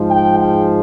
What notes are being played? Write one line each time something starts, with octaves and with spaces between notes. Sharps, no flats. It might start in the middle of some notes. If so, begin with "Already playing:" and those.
Already playing: G#2 F3 G#3
G5
G5